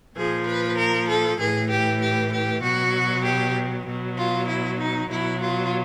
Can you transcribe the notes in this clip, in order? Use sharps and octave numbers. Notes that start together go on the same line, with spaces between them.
A#2 F3 G#4
B4
A#4
A4
A2 E3 G#4
G4
G4
G4
B2 F#3 F#4
G4
B2 F#3
F4
E4
D#4
B2 F#3 E4
F4